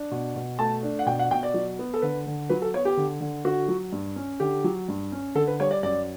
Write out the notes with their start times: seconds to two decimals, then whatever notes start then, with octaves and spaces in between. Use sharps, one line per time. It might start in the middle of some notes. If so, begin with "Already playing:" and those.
Already playing: D4
0.11 B2
0.36 B2
0.59 A3 A5
0.83 D4
0.99 F#5
1.06 B2 G5
1.19 F#5
1.31 B2 G5
1.43 D5
1.54 F#3
1.79 B3
1.94 A4
2.02 D3 B4
2.27 D3
2.49 F#3 B4
2.62 A4
2.73 B3 C#5
2.85 G4
2.97 D3
3.21 D3
3.45 D3 F#4
3.68 F#3
3.92 G2
4.16 C#4
4.40 D3 G4
4.64 F#3
4.88 G2
5.12 C#4
5.35 D3 A4
5.47 B4
5.60 G3 C#5
5.71 D5
5.83 F#2 D5